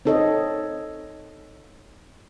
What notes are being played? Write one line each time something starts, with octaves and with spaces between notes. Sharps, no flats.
C4 D#4 A4 C#5 D#5